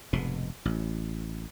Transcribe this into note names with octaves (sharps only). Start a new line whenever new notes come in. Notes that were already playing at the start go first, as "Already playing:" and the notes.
F1 G#2 B2
A1